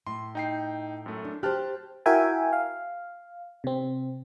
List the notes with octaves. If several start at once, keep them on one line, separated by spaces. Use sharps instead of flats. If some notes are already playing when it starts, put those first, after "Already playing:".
A2 C6
D#4 G5 C7
F#2 A3
D4
G4 C5 A5 F6 F#6
E4 F#4 A#4 E5 G5 G#5
F5
C3 C4